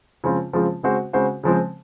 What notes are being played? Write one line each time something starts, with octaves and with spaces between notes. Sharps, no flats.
C#3 F3 G#3 C4 F4
C#3 F3 G#3 C4 F4
C#3 G#3 C4 F#4 C5
C#3 G#3 C4 F#4 C5
C#3 F3 G#3 C4